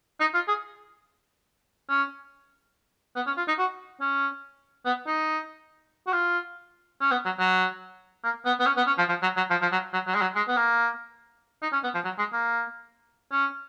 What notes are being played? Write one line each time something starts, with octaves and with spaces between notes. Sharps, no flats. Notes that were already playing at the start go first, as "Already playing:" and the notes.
D#4
F4
G#4
C#4
B3
C#4
F4
D#4
F#4
C#4
B3
D#4
F#4
F4
C#4
B3
F#3
F#3
A#3
B3
B3
C#4
B3
C#4
F3
F3
F#3
F#3
F3
F3
F#3
F#3
F#3
G#3
F#3
G#3
B3
A#3
D#4
C#4
B3
F3
F#3
G#3
A#3
C#4